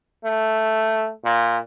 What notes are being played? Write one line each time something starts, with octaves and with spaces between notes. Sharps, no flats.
A3
A#2